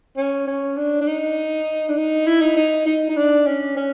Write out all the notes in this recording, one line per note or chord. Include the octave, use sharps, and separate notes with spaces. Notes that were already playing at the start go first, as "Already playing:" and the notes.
C#4
C#4
D4
D4
D#4
D4
D#4
E4
D#4
D#4
D#4
D#4
D4
C#4
C#4